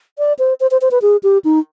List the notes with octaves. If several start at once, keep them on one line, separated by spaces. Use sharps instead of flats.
D5
C5
C5
C5
C5
B4
G#4
G4
D#4